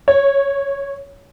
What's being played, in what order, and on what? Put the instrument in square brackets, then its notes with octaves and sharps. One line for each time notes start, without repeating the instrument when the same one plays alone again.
[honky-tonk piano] C#5